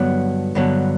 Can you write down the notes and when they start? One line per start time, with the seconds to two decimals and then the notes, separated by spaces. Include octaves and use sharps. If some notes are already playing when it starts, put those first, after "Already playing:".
Already playing: G2 D3 F#3 B3
0.55 G2 D3 F#3 B3